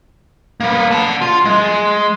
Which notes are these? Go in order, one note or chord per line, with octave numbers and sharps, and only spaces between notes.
A#3 B3
F#5 A5
F4
G#3